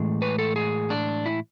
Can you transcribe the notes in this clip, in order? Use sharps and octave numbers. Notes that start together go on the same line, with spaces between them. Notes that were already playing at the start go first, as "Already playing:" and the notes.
Already playing: A2 E3 G#3
B4
A4
G#4
D4
E4